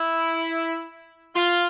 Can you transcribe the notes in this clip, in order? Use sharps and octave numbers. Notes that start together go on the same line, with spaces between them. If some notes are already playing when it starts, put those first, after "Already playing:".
Already playing: E4
F4